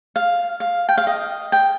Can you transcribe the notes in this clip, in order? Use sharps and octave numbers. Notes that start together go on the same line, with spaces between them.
F5
F5
G5
F5
D#5
G5